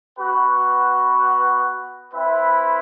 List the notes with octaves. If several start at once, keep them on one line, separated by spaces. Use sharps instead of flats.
B3 F#4 B4 F#5
C4 E4 B4 E5